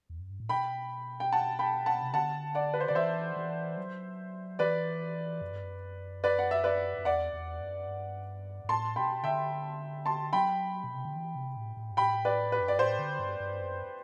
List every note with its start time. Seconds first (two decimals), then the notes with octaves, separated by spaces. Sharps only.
0.10 E2
0.20 F#2
0.30 G2
0.40 A2
0.49 B2 G5 B5
1.20 G5
1.32 F#5 A5
1.59 G5 B5
1.86 F#5 A5
2.02 C3
2.14 D3 F#5 A5
2.55 D5 F#5
2.74 B4
2.80 C5
2.88 D3 D5
2.95 E3 C5 E5
3.36 E3
3.77 F#3
4.59 E3 B4 D5
5.42 F#2
5.52 G2
5.63 F#2
6.24 B4 D5
6.39 F#5
6.51 E5
6.64 B4 D5
6.98 F#2
7.05 E2 D5 F#5
7.33 E2
7.60 F#2
7.87 G2
8.64 G2
8.69 A2 A5 C6
8.96 B2 G5 B5
9.23 D3 E5 G5
10.06 A5 C6
10.33 F#3 G5 B5
10.84 B2
10.94 C3
11.05 D3
11.16 E3
11.35 C3
11.57 A2
11.77 A2
11.91 G2
11.97 A2 G5 B5
12.25 B4 D5
12.52 B4
12.60 F#2
12.68 G2 D5
12.79 A2 C5
12.99 D3
13.19 G2
13.40 G2
13.61 F#2